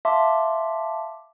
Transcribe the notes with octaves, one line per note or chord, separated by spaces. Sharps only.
E5 F5 A5 C6 D6